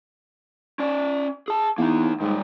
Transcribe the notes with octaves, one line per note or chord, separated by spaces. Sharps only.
C#4 D5
G#4 A5
E2 A#3 D#4
G#2 D#3 G3